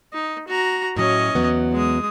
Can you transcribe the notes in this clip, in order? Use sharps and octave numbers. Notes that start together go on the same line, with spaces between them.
D#4
F#4 A#5
A2 F#3 C#4 D#5
E2 F#3 B3
G#3 D#6